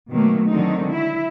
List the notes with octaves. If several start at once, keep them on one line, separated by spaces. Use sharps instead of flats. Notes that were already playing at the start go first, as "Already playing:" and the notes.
B2 D#3 F#3 A3 A#3
D3 D#3 F#3 G#3 C4 D#4
E4 E5